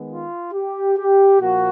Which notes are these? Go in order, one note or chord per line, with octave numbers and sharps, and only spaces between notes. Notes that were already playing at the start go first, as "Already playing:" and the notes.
Already playing: D#3 G#3 B3
F4
G4
G4
A#2 F3 A#3 F#4